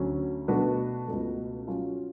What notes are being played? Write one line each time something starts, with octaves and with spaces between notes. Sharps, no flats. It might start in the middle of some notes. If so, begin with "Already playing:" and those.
Already playing: D2 D3 F#3 C#4
B2 A3 D4 F#4 B4
C#2 B2 A3
F#3 C#4 F4